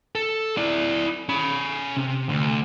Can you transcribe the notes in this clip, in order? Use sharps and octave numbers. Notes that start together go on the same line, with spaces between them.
A4
E4 D5
C#4 B5
C3
D2